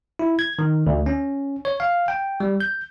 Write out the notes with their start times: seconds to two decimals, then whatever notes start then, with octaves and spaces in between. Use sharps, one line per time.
0.19 E4
0.39 G#6
0.59 D#3
0.87 D2
1.06 C#4
1.65 C#5
1.80 F5
2.08 G5
2.40 G3
2.60 G6